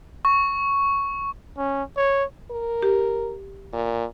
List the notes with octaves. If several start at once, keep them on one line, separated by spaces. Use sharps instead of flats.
C#6
C#4
C#5
A#4
G4
A#2